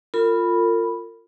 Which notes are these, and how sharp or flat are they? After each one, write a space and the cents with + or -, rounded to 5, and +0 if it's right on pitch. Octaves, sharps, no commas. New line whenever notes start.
F4 +0 A#4 -45 B5 -5